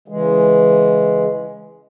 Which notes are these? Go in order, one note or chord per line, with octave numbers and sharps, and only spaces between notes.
C#3 E3 G#3